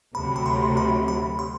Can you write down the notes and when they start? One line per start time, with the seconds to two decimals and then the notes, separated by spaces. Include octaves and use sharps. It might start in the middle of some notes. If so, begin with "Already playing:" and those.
0.15 D2 C3 F#3 B5
0.36 B5
0.46 C6
0.77 B5
1.08 B5
1.39 C6